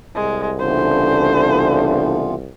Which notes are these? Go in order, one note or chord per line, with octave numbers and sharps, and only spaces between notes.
C2 G#3
C#3 E3 B3 D4 F4 A4 C5